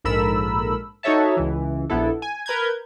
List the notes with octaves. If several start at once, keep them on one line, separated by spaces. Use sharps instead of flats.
A#1 G#2 A4 A#4 B5 E6
D#4 F#4 A4 C#5 E5 A5
C#2 E3
A#1 B3 E4 A4
G#5
A#4 B4 A#5 G6 G#6